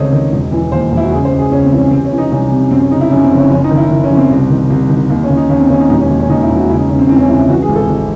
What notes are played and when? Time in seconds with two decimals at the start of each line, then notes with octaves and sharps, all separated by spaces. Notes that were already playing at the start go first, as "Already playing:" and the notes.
Already playing: C#2 C3 D#3 A4 C5 C#5 D#5
0.12 D#3
0.32 E1
0.52 E3
0.72 D#2 C5
0.92 E1
0.97 E4
1.05 F#4
1.12 C#3 G#4
1.25 C5
1.32 C#2
1.39 G#4
1.52 C#2 C#4
1.65 C4
1.72 E3
1.78 C#4
1.91 C3 C4
2.05 C#4
2.11 E3
2.18 D#4
2.31 C2 C#4
2.51 C3
2.71 F#2 C4
2.81 C#4
2.91 C#3 D#4
3.01 E4
3.11 F#2 C#4
3.24 C4
3.31 F#1
3.37 C#4
3.51 F#1 C#4
3.64 D#4
3.71 D#3
3.77 E4
3.91 D#3 E4
4.04 C#4
4.11 F#1
4.17 C4
4.31 C2
4.50 D#3
4.70 C2
4.90 D#3
5.10 D#2
5.23 C#4
5.30 D#2
5.37 D#4
5.49 D#2 C#4
5.60 C4
5.70 D#2 C#4
5.80 D#4
5.90 E1 D#4
6.00 C#4
6.09 D#2
6.20 C#4
6.29 D#2 D#4
6.43 E4
6.50 E1
6.56 F#4
6.69 C#3 E4
6.79 D#4
6.89 C#3 C#4
6.99 C4
7.09 E3 C4
7.19 C#4
7.29 C#2 E4
7.39 E4
7.49 E3 F#4
7.62 G#4
7.69 G#1
7.76 A4
7.89 G#1